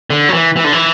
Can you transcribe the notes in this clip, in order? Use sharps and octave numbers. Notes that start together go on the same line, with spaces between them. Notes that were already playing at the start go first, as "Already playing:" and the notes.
D3
F#3
E3
E3
D3
E3